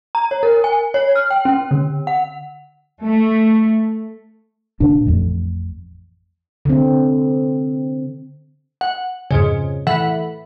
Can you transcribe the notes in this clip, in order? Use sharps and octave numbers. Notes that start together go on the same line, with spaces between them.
A#5
C#5
A#4
G#5
C#5
F6
G5
C#4
D3
F#5
A3
A#2 D3 D4
A1 F2
D3 C4
F#5
F2 G#2 C#3
A2 E3 F#5 B6